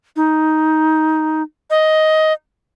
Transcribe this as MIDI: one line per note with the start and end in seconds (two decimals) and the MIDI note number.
0.16 1.42 63
1.70 2.33 75